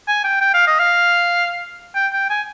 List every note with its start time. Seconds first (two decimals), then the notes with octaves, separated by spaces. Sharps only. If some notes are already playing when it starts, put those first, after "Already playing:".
0.08 G#5
0.24 G5
0.41 G5
0.54 F5
0.68 D#5
0.80 F5
1.95 G5
2.13 G5
2.30 G#5